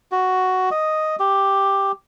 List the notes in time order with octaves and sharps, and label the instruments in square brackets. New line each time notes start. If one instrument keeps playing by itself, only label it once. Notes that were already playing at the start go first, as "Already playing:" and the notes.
[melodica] F#4
D#5
G4